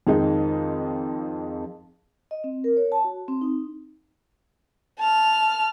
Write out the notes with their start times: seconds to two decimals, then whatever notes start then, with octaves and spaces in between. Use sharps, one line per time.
0.07 F2 D#3 G#3 D#4
2.31 D#5
2.44 C4
2.64 A#4
2.77 C#5
2.92 A5
3.04 F#4
3.28 C4
3.41 D#4
4.99 A5 F6